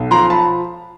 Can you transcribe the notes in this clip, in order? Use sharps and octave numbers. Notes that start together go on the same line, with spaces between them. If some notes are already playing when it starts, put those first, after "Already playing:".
Already playing: B1
F3 A#5 C6
A5 B5